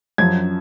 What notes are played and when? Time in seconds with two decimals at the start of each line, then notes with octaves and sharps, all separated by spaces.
0.18 F#2 F3 G#6